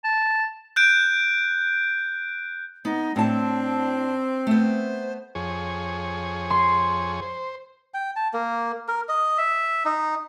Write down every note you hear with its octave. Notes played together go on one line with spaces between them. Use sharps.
A5
F#6 G6 D7
B3 D#4
A2 C4 D4 A5
A3 B3 C5
F2 G#4 C#5
C6
C5
G5
A5
A#3
A#4
D#5
E5
D#4